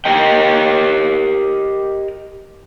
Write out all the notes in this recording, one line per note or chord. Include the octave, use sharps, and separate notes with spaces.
G4 A#4 D#5 G5